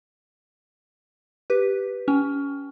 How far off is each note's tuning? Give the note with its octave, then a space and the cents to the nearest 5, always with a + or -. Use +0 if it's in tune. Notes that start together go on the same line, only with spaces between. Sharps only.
G4 +0 B4 +0
C#4 +20 G5 +0